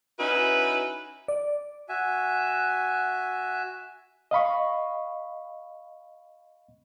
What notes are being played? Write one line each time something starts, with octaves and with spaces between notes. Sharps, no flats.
C#4 D#4 E4 F#4 B4
D5
F#4 E5 G#5
D#5 F5 B5 C#6